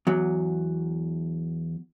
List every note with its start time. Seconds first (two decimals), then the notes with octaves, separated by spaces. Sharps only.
0.07 E2 F#3